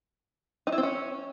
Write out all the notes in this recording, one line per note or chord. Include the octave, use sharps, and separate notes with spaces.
D#4
E4
C4
C#4